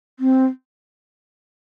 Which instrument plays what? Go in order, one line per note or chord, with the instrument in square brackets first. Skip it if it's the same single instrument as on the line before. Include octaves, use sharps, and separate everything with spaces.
[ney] C4